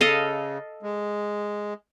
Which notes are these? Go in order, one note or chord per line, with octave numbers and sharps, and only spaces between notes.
C#3 A4 D#5 F5
G#3